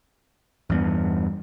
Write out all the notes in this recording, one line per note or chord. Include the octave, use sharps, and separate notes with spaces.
E2 G2 B3